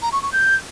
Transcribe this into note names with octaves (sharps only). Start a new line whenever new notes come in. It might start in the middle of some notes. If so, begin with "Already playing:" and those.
A#5
C#6
C#6
G6